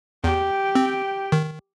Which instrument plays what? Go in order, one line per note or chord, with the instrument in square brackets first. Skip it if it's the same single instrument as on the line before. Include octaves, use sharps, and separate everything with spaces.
[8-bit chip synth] E2 [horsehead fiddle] G4 G5
[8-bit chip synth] C4
D#3